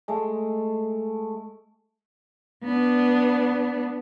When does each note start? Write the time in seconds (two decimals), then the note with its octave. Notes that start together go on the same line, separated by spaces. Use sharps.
0.08 G#3 A3
2.64 B3 D4